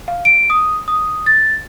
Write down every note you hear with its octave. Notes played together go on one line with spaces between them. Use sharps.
F5
D7
D#6
D#6
A6